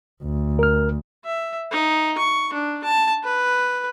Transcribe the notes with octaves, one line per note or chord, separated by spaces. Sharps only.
D2
A#4 F6
E5
D#4
C#6
D4
A5
B4